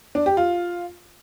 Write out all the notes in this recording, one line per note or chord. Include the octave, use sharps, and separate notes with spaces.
D4
G4
F4